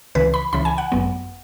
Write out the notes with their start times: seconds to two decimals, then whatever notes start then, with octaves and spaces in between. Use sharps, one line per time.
0.15 C#2 C#3 E3 B4
0.34 B5
0.53 C#2 C#3 E3 B5
0.65 G#5
0.78 F#5
0.92 G#1 F#2 F#3 B3